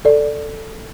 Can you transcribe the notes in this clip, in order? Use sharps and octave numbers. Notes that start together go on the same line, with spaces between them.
A4 D5